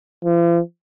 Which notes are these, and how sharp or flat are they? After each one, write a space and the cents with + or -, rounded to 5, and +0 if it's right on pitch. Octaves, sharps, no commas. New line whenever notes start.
F3 -45